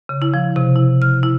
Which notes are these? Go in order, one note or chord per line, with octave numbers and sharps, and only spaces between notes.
C#3
E4
F3
C3
E4
F6
E4